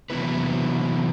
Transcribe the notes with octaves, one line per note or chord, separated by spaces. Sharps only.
C3 E3 F#3 B3 E4 B4